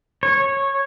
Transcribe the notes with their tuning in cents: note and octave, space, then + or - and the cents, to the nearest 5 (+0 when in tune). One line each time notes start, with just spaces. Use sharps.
C#5 -15